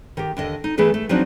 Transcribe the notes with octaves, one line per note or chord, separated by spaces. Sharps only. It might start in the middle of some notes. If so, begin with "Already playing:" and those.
D#3 G4
D#2 D3 D#5
D#4
E3 A3 B3 G#4 B4
A3
F3 F#3 C4 D4 D#4 F#4